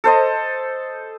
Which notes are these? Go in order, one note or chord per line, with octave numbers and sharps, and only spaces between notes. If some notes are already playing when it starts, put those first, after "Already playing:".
A4 C5 D#5